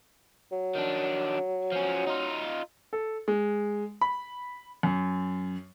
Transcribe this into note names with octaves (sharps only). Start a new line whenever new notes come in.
F#3
D#3 D4
F3 C#4
D#4 F4
A4
G#3
B5
F#2